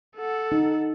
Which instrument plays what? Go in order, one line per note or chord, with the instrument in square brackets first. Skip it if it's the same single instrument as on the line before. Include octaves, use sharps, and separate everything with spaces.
[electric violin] A4 F#5
[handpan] D#4